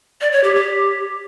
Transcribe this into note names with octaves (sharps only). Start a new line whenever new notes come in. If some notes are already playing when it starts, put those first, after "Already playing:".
D5
C#5
G4
G4